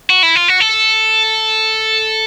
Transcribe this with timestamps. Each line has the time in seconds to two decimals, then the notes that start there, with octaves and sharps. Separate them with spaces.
0.10 F#4
0.23 E4
0.36 F4
0.48 F#4
0.60 A4